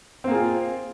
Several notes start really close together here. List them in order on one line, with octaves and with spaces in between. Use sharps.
C4 A#3 G#4 F4